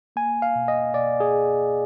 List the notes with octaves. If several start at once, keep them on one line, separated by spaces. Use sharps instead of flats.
A#3 G#5
F5
B2
D#5
B2 D5
G#4